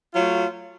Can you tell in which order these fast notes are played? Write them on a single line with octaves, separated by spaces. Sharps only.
F4 F#3 A3